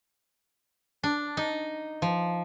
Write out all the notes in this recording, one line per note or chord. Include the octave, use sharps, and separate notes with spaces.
D4
D#4
F3